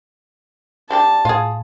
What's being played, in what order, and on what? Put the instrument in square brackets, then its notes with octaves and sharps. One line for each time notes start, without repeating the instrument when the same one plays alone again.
[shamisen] G3 D4 G4 [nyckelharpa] A5
[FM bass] A2 [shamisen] F4 G#4